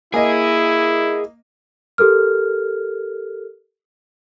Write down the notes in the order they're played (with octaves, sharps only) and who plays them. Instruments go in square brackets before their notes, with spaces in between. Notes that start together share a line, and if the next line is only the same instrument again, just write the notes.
[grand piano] A#3 D#5 [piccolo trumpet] E4 [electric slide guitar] G#4 G#5
[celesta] G4 A4 A#4 F6